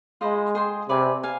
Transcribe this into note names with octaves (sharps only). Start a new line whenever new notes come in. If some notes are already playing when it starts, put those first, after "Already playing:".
G#3 F4 C5 D#5 B5
G#4 C5 G5 C6
C3 B4 D5 G#5 B5
F5 G#5